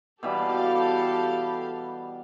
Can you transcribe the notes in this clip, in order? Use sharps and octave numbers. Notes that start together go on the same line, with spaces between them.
B2 E3 G3 G4 A4 F5